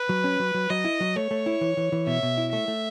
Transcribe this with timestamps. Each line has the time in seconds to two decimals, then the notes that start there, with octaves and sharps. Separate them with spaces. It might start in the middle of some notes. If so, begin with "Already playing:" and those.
Already playing: B4
0.09 F#3
0.24 C#4
0.40 F#3
0.54 F#3
0.70 F#3 D#5
0.85 E4
1.00 F#3
1.16 A3 C#5
1.31 A3
1.46 E4
1.61 E3
1.77 E3
1.92 E3
2.07 B2 E5
2.23 B2
2.38 E4
2.53 A3 E5
2.68 A3